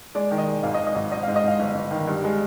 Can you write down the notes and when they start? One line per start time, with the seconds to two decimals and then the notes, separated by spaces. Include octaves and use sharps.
0.15 G#3 D5
0.31 D#3
0.38 D#5
0.47 G#3
0.63 G#1 F5
0.74 D#5
0.79 G#1
0.87 D#5
0.95 G#1
1.12 G#2 D#5
1.23 G#2 F5
1.36 D#5
1.44 G#2 F5
1.59 G1
1.75 G1
1.91 D#3
2.07 G2
2.24 G#3